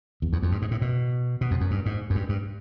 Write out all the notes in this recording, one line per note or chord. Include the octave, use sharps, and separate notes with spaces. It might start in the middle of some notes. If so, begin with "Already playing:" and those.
E2
E2
F2
G2
G#2
A2
B2
B2
F2
F#2
G2
G#2
F#2
G2
G2